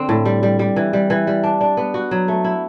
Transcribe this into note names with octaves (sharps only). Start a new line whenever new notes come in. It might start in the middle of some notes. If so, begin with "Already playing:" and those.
Already playing: D3 C4
A2
G3
G3
G3
E3
G3
E3
G3
D4
D4
B3
F#4
F#3
A3
E4